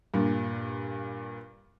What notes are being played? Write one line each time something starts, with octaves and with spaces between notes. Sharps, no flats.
G2 A#2